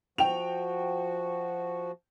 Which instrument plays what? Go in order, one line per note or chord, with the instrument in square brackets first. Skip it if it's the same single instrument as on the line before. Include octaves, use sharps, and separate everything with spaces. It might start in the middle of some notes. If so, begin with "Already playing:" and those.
[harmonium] F3 F#4 [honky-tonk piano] G5 F7